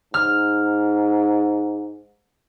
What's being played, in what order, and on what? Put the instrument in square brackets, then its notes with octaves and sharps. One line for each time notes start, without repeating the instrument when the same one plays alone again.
[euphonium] G#2 [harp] F6